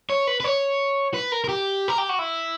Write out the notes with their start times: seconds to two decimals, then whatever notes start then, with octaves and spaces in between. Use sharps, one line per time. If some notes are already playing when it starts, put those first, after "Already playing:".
0.10 C#5
0.27 B4
0.40 B4
0.44 C#5
1.14 B4
1.32 A#4
1.44 A#4
1.49 G4
1.88 A#4
1.98 G4
2.09 F#4
2.19 E4